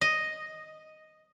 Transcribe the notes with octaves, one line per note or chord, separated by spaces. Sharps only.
D#5